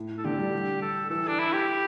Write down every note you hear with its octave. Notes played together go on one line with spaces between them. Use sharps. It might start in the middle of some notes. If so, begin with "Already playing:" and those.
Already playing: A2
A4
D3 G4
G3
G3
A4
E3 A4
D4
E4
G4